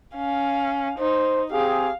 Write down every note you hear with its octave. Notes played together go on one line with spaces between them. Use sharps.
C#4 F5
D#4 C5
C4 G4 G#4 F5